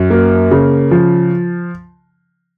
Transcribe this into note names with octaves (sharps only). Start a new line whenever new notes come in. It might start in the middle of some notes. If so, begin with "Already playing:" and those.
Already playing: F#2
A#3
C#3
F3